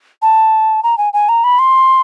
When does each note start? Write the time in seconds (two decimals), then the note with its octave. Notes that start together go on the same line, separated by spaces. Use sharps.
0.22 A5
0.83 A#5
0.98 G#5
1.13 G#5
1.29 A#5
1.44 B5
1.59 C6